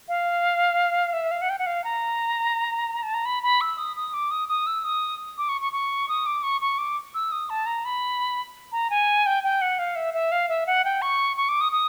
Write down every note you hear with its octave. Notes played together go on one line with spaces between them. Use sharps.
F5
E5
F5
F#5
G5
F#5
F5
A#5
A5
A#5
B5
B5
E6
D#6
D#6
D6
D#6
D#6
E6
D#6
D6
C#6
C#6
C#6
D#6
D6
C#6
C#6
D6
E6
D#6
A5
A#5
B5
A#5
G#5
G5
G5
F#5
F5
E5
E5
F5
E5
F#5
G5
C#6
C#6
D6
D#6
D#6